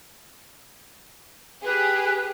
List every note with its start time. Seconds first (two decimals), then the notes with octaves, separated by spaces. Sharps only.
1.65 G4 G#4 B4